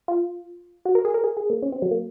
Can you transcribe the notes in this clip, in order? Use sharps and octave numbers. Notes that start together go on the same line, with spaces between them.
F4
F#4
A#4
G#4
A#4
G#4
G#4
A#3
C#4
C4
F#3
A#3